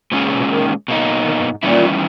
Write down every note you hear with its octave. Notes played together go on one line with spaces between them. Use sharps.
A#2 G#3 C#4 G#4
C#3
B2
D#3
B2 A#3 D#4
D#3
G2
G#2
E2 A#2 D#3 G3 C#4 E4